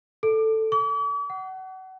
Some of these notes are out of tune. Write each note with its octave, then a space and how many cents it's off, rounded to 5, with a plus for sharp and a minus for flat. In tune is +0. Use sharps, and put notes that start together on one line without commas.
A4 +5
D6 -45
F#5 +30